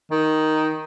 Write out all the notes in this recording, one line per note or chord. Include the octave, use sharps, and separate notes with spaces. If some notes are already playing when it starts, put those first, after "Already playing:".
D#3